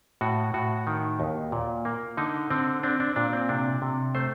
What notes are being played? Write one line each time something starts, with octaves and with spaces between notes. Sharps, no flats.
A2 F#4
A2 F#4
D#3
D#2
A#2
A#3
D3 D#4
D3 C4
C4 D4
D4
A#2 D4
C4
C3 D4
C3
A3 C5